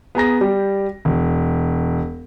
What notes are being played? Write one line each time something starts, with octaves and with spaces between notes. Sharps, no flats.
B3 G#4 A#5 A#6
G3 G4
E1